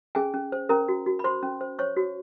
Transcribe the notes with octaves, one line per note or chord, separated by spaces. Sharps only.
C#4 G#4 G#5
C#4
C5
C#4 A#4 A#5
F#4
F#4
B5
C5 C6
C#4
C5
C5 C#5 C#6
F#4